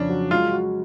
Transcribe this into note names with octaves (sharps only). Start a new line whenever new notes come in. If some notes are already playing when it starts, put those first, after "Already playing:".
Already playing: F2 C#3 C#4 D4
F#3
G#3 F4
F#4